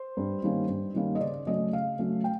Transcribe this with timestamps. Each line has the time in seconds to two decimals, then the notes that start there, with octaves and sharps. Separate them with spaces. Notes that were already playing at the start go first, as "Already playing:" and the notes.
Already playing: C5
0.17 G2
0.43 D#3 G3 A#3 C#4
0.68 G2
0.94 D#3 G3 A#3 C#4
1.15 D#5
1.21 C#3 D5
1.46 F#3 A3 C#4 D#5
1.72 C#3 F5
1.99 F#3 A3 C#4
2.24 G5